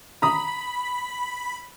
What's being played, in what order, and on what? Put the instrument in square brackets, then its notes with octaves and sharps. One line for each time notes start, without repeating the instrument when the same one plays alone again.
[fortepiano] A#5 D#6 [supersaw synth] B5